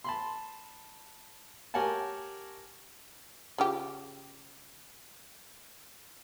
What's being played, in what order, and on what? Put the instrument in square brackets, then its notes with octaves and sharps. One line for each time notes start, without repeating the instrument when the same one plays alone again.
[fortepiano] A5 B5 C6
G4 A#4 C#5 F#5 G#5 A5
[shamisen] C#3 F4 G4